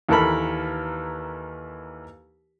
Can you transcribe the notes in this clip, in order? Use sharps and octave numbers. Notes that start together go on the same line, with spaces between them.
D#2 E3 A4 A#4 B5